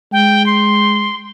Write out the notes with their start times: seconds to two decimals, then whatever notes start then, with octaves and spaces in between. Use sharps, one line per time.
0.12 G#3 G5
0.46 C6